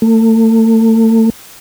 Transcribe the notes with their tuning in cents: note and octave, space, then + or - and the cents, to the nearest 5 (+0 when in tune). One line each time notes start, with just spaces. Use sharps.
A3 +35